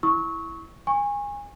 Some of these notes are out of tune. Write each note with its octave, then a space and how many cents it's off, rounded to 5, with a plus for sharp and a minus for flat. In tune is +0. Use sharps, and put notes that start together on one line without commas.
E4 +0 C#6 +0 E6 -35
G#5 -25 C#6 -25